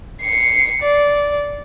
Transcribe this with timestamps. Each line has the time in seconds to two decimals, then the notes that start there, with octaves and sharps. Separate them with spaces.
0.22 C7 C#7
0.82 D5